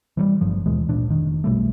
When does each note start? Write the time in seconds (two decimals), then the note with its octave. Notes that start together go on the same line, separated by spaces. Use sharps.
0.17 E3 F#3 G3
0.41 G1 G2 F3
0.66 D#2 B2 E3 G#3
0.89 C#2 A#2 D4
1.09 F1 D#3
1.44 B1 B2 G3 A3